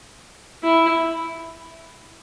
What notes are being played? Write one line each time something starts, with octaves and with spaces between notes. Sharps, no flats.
E4